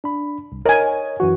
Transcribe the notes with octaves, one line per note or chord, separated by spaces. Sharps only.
D4 B5
C2
A#4 C#5 D#5 G#5
F#2 E3 F#4